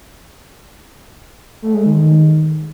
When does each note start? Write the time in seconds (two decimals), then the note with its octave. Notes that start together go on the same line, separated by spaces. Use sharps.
1.62 A3
1.74 G#3
1.86 D#3